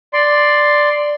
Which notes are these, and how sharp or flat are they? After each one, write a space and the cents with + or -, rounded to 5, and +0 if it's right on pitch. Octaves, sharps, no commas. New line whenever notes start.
D5 +0 C6 +0